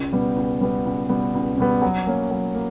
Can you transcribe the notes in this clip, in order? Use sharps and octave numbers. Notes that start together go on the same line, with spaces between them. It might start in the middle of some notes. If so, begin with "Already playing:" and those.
Already playing: C#2
B2 G3 B3
C#2
B2 G3 B3
C#2
B2 G3 B3
C#2
B2 G3 B3
F#3
A#3 C#4
F#3
A#3